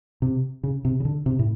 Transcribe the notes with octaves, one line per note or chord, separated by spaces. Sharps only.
C3
C#3
C3
C#3
D3
C3
A2